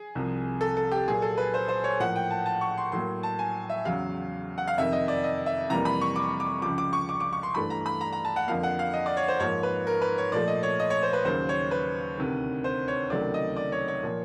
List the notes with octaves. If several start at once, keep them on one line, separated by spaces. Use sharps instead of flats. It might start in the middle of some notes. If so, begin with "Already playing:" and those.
Already playing: G#4
C2 C3 F3
A4
A4
G4
A#2 F#3 A#3 G#4
A4
B4
C5
C5
C#5
A2 F3 A#3 F#5
G5
A5
A5
C#6
C6
A2 F#3 A#3 C6
A5
G#5
E5
E2 C#3 F#3 F5
F#5
F5
F2 C3 D#3 E5
D#5
D5
D#5
E5
F2 C3 E3 G3 A#3 A#5
B5
C#6
D6
D6
C#2 C#3 F3 D6
D6
C#6
D6
D6
C#6
C6
G2 E3 A3 B5
A#5
B5
A#5
A#5
A5
F#5
F2 D3 F3 A#3 F5
F#5
F5
D#5
D5
C#5
C5
G#2 F3 A#3 C#5
B4
A#4
B4
C#5
A#2 F3 A3 D5
D#5
C#5
D#5
C#5
C5
B4
D#2 C#3 F#3 A#3 C5
C#5
B4
D2 C3 D#3
C5
C#5
C#2 C3 D#3 F#3 A3 D5
D#5
D5
C#5
C#5
A#2 F3 A#3